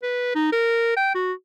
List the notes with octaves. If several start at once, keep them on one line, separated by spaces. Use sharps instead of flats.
B4
D#4
A#4
G5
F#4